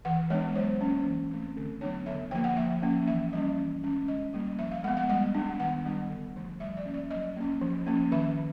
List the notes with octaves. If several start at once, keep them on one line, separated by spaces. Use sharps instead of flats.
E3 F#5
G#3 B3 D4 C#5
F#3 C5
A#3 C#4
E3
A3 C4
D3
F#3 B3 D4 C#5
D3 E5
F3 A#3 G5
F#5
F3 E5
A#3 C#4
E3 E5
G3 A#3 C#4 D#5
E3
G#3 C#4
D3 D#5
G3 A#3
F3 E5
F5
G#3 B3 F#5
F#5
G3 F#5
B3 D4
D#3 F#5
G3 B3 D4
D3
F3 A3
G3 E5
D5
A#3 C#4
D5
F#3 D#5
A#3 C#4
F3
A#3 C#4
D#3 E5